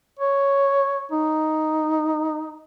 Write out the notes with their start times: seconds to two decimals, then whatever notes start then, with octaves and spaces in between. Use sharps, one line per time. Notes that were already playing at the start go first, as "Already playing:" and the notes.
0.20 C#5
1.12 D#4